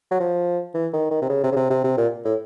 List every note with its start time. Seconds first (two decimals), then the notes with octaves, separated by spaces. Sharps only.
0.11 F#3
0.20 F3
0.74 E3
0.93 D#3
1.11 D#3
1.22 C3
1.29 C#3
1.43 C3
1.52 C#3
1.56 C3
1.70 C3
1.84 C3
1.98 A#2
2.25 A2